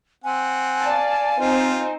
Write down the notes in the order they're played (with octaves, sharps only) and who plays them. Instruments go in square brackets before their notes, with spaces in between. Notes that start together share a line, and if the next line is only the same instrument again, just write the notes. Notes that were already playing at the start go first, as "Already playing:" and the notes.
[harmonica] C4 F#5 [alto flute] G#5
[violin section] D5 F5 A5
[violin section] C4 D#4 C5 [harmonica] F4